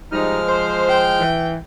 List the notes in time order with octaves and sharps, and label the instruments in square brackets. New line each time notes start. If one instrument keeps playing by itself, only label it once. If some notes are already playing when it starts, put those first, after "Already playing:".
[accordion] F3 G#3 F6 [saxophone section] G3 D#4
[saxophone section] C5
[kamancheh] G5
[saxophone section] E3